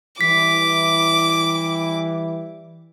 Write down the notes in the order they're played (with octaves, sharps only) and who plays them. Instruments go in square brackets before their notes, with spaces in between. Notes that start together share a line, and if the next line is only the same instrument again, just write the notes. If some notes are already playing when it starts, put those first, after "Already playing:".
[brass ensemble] E3 G3 E4 [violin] D6 [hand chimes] B6